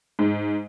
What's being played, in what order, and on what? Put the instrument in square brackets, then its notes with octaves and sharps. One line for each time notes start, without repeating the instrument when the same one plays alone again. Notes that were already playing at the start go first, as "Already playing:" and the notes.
[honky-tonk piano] G#2